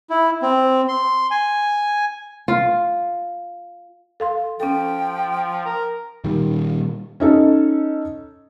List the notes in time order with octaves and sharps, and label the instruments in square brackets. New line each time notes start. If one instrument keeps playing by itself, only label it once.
[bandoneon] E4
C4
C6
G#5
[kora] F4
[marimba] A4 F5 C6
[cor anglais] F3 [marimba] C#4 A4 [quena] G5
[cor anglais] A#4
[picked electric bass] A#2 D#3 G3
[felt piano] C#4 D#4 A4